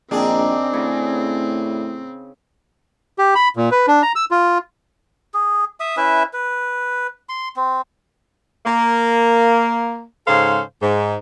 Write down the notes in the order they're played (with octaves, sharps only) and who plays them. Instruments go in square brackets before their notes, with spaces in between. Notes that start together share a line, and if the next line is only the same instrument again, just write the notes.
[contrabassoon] A#1 [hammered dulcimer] D#3 [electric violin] C4 [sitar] D4 G#4
[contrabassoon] A2 [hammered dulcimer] C#3
[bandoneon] G4
B5
A#2
B4
D4
A#5
E6
F4
[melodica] G#4
E5 D#6
C#4 E4 B4 E5
B4
C6
C4
[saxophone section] A#3
G#2 C#3 A4 C5 F5
G#2